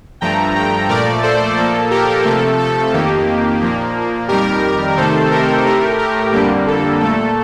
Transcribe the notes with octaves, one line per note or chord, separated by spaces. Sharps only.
G2 F3 A3 G5 A#5
G5 A#5
A#2 F3 A3 A#4 D5
A4 C5
A#2 F3 A#3 A4
G4 A#4
C3 F3 A3 A4
A4
F2 D#3 A#3 G4
A#2 F3 A#3
F2 D#3 G3 G4 A#4
C3 D#3 A3 A4 C5
G4 A#4
A2 A3 G4 A#4
G4 A#4
F2 D3 G3 A#3 G4
A4
A#2 A3 A4